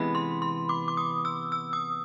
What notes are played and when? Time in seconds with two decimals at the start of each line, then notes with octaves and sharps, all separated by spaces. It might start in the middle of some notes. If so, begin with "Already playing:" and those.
Already playing: C3 E3 G#3 B3 B5
0.15 C6
0.42 C6
0.69 D6
0.88 D6
0.97 D#6
1.25 E6
1.52 E6
1.73 D#6